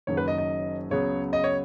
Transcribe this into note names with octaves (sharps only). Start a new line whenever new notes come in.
F#1 F#2 D#3 F#3 C#5
B4
D#5
D#5
C#2 C#3 F#3 B3 C#5
D#5
C#5